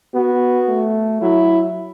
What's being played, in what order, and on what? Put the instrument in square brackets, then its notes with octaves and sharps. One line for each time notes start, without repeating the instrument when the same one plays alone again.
[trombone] B3 [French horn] F#4
[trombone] A3
[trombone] F#3 [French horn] E4